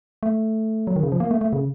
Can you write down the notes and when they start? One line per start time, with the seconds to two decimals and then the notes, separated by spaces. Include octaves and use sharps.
0.23 A3
0.87 F#3
0.96 D#3
1.03 C#3
1.12 F3
1.20 A#3
1.31 A3
1.41 A3
1.53 C#3